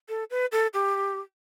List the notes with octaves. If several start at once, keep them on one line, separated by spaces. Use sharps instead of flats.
A4
B4
A4
G4